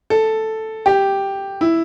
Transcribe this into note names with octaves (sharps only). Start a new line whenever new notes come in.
A4
G4
E4